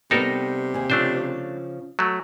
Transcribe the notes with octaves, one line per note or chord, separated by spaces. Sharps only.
C3 G3 B3 D#4 A4 A#4
D#2 G#4
C#3 F3 A3 D4 C5
F#3 A3